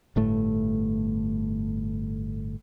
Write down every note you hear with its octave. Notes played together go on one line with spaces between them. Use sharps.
G1 A2 A3